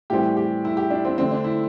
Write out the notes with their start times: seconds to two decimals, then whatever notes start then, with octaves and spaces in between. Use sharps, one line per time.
0.10 A2 E3 G3 C4 G4
0.37 G4
0.65 E4
0.77 G4
0.90 D4
1.05 C4
1.18 D3 A3 C4
1.31 D4
1.44 E4